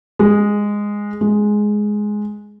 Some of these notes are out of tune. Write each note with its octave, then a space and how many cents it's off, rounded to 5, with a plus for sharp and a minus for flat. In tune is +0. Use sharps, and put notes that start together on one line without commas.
G#3 -10
G#3 +5